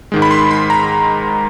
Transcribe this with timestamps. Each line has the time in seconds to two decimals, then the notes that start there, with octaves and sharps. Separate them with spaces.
0.12 G#2 D#3 G#3
0.22 B5
0.31 C6
0.51 B5
0.70 A#5